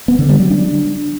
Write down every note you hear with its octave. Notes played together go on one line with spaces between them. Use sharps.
B3
D3
G3
F#3
D4